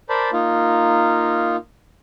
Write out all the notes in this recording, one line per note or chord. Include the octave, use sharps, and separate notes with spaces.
A#4 C5 D5 A5 B5
A#3 D#4 F4